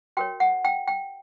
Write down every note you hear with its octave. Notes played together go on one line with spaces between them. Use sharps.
F#4 A#4 C#5 G5
F#5
G5
G5